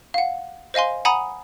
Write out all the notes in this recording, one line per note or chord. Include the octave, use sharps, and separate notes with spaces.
F5 F#5
C5 D#5 F5 G#5 C6
F#5 G#5 A#5 B5 D#6